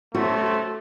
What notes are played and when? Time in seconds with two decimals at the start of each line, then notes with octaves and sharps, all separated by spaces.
0.14 F#2 A2 C3 A3 F#4